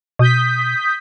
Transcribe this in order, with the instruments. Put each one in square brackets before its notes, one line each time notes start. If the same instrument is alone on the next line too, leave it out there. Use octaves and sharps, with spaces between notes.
[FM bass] B2 [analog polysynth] D#6 G6 B6